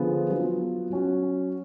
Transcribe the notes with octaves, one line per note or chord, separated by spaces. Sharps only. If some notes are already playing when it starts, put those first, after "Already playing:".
Already playing: D3 F3 B3 F4 G#4
F#3 B3 F4
F#3 C#4 F#4